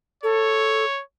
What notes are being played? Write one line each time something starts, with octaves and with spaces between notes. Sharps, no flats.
A4 C#5